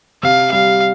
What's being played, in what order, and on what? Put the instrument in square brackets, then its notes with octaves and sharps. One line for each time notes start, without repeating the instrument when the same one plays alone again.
[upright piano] C3 [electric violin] F5
[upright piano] G3 [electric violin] F5